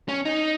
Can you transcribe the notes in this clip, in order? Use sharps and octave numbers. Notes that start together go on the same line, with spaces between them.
C#4
D#4